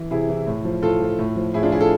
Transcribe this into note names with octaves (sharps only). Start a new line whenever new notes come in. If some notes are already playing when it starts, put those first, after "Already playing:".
Already playing: E3
C3 E4 G#4
E3
A2
F3
A2 F4 A4
F3
A2
F3
A2 E4 G#4
D4 F4
F3 E4 G#4
F4 A4